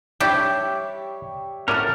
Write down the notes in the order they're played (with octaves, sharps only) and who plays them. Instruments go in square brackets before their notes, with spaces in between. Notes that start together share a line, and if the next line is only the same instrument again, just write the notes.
[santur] G3 C#5 E5 [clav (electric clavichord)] D4 E4 [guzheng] G4
[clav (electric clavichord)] A2 C#4 F#5 [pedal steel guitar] A#4 [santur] D5 A5